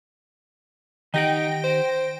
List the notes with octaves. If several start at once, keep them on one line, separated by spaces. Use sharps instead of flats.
D#3 D#4 G4 F#5 G5 A#6 D7
C5